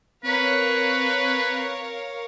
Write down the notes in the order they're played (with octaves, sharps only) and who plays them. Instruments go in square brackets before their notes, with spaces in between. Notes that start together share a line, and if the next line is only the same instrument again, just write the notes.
[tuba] C4 [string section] A#4 C#5 F5 [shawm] B4